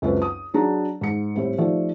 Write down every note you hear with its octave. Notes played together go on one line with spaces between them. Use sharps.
C#2 F#2 C4 F4 A4 B4
D#6
F#3 D4 G#4 A#5
G#2 C#7
A2 G3 C4
F3 A3 D#4 G4 D5